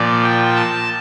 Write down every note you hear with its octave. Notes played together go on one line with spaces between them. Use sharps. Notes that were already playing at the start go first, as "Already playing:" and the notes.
Already playing: A#2 F3 D5
G5
A5